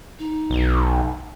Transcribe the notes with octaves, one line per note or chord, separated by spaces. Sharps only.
D#4
B1